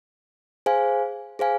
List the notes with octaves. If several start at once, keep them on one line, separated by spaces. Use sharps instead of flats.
G#4 C5 F5 G#5
G#4 C5 F5 G#5